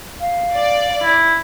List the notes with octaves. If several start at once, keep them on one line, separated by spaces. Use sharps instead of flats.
F5
D5
E4